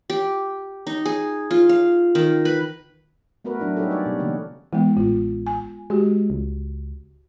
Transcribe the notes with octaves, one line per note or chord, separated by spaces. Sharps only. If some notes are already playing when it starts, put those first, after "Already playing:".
G4
D#4
G#4
F4
F5
D#3
B4
A3 B3 F#4 A#4 B4
F#3 D4 E4
G3 C#4 D#4 G4 A4
C#5 D5
B2
C#3 E3 A#3
E3 G#3 B3
A1 F4
G#5
G#3 F#4 G4
C#2